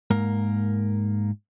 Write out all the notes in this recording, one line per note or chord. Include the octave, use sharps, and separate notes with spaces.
G#2 A#3 A#4